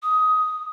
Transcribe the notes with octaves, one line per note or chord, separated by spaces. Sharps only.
D#6